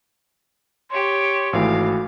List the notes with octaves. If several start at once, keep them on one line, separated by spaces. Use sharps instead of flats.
G4 C#5 C6
G#1 E3 A3 F#4 F5